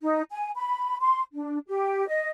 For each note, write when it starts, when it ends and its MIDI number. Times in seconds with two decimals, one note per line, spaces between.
0.01 0.22 63
0.32 0.51 80
0.56 0.97 83
1.01 1.21 84
1.34 1.59 62
1.68 2.07 67
2.08 2.28 75